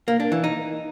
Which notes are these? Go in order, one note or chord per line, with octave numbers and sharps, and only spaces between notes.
A#3
D4
E3
D#4